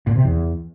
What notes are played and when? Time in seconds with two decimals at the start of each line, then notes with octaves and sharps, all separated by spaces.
0.07 A#2
0.16 C3
0.25 E2